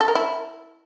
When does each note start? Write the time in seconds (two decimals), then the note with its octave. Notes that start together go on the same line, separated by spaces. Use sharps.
0.01 A4
0.08 A#4
0.15 E4